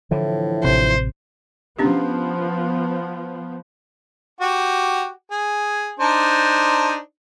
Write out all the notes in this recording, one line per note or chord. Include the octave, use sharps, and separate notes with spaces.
A2 D3 E3 F3
A1 C3 C5
F3 B3 C#4 D4 G4
F#4 G4
G#4
D4 D#4 C5